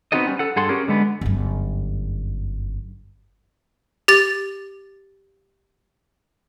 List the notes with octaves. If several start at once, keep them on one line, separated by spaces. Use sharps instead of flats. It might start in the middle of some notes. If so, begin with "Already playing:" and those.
B3 C4 D#4 F#4 A4 D#5
G3 C#4
A4 F#5
G2 G#4 A4 F#5 C6
C#4 G4 G#4 A#4
D3 G#3 B3
G1 F#2
G4 A6